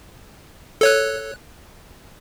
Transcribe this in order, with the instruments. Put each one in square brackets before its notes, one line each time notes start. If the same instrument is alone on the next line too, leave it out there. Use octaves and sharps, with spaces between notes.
[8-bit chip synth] A4 C#5 F#6